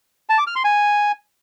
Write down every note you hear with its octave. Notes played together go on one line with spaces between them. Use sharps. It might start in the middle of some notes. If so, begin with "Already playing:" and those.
A5
D6
F6
C6
G#5